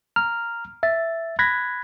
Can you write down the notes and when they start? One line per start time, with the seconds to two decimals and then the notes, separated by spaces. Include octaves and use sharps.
0.16 A#5 F6
0.83 E5 A6
1.39 B5 F#6 G#6 A#6 B6